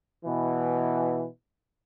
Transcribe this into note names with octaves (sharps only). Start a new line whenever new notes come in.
B2 E3